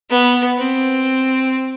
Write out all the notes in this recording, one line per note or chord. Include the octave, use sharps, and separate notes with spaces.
B3
C4